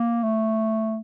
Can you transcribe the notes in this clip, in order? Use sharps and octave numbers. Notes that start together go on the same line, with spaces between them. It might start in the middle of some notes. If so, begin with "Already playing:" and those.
Already playing: A#3
A3